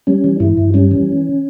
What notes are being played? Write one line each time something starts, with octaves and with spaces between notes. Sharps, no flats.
G3 C#4
E3
G2 E4
G2
G3 C#4
E3